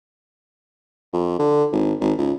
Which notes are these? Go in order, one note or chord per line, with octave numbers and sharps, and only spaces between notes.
F2
D3
G#1
G#1
C#2